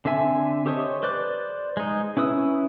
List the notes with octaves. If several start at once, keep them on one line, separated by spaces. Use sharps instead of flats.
D3 C4 A4 E5 G#5
G4 A4 C5 C#5 D#5
B4 C5 D5 D6 F#6
G#3 D#4
C#4 E4 B4 D#6 E6